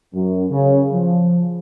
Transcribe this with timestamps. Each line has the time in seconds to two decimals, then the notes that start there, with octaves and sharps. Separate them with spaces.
0.14 F#2
0.51 C#3
0.92 F3